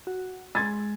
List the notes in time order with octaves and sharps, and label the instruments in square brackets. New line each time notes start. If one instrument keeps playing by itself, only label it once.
[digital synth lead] F#4
[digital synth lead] G#3 [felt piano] C6 G#6 A6